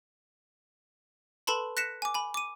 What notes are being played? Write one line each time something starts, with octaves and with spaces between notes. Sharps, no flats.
A4 B4 A5 B5 C6
F#6 A#6 B6 C#7 E7
G#5 D6
G#5 B5
D6 D#7